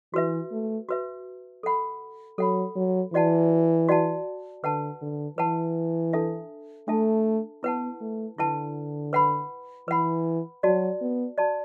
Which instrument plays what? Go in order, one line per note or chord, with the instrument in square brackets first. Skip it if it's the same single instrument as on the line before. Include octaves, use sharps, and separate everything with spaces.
[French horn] E3 [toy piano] F#4 B4 E5
[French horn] A3
[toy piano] F#4 B4 E5
A4 F#5 B5
[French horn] F#3 [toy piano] A4 F#5 B5
[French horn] F#3
[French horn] E3 [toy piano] F#4 D5 F#5 A5
[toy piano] F#4 D5 F#5 A5
[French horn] D3 [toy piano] B4 F#5 A5
[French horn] D3
[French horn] E3 [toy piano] B4 F#5 A5
[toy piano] D4 A4 E5 A5
[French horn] A3 [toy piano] D4 A4 E5 A5
[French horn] B3 [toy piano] E4 B4 F#5 A5
[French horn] A3
[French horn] D3 [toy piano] E4 B4 F#5 A5
[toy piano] B4 F#5 B5
[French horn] E3 [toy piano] B4 F#5 B5
[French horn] F#3 [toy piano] F#4 D5 A5
[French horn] B3
[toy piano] F#4 D5 A5